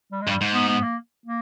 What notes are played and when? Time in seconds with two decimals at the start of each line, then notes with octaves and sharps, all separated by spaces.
0.12 G3
0.22 G#3
0.27 G2
0.30 G3
0.41 G#2
0.54 B3
0.69 B3
0.83 A#3
1.26 A#3